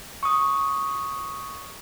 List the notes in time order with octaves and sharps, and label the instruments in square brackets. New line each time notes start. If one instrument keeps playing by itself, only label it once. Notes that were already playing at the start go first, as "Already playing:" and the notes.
[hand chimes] C#6 D#6